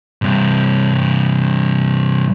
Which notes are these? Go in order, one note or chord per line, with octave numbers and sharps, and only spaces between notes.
G2 C3